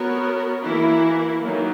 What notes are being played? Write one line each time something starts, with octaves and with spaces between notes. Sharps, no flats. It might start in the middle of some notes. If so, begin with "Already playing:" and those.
Already playing: B3 F#4 A#4 C#5
E3 A#3 E4
D#3 F#3 A#3